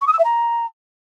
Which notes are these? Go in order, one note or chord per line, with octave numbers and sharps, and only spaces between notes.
C#6
D#6
E6
E5
A#5